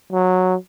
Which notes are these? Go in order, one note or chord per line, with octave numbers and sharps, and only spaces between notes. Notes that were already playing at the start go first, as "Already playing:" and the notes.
F#3